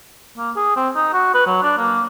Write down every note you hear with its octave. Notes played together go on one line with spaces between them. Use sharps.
A#3
G#4
C4
D#4
F#4
B4
F#3
D4
A#3